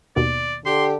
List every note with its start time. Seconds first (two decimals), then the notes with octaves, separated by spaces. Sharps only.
0.16 D#2 B2 D5
0.66 D3 G4 C6